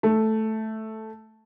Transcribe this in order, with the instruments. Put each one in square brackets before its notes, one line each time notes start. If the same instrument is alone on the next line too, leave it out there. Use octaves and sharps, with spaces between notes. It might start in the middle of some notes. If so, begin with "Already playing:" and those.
[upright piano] A3